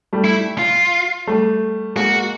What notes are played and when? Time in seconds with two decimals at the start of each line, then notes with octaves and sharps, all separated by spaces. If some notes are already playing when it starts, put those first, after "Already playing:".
0.13 G3 A3
0.24 E4
0.58 F4
1.27 G3 A3
1.96 G#3 A#3 F#4